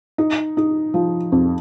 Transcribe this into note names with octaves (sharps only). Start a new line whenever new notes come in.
D#4
D#4
F3
F2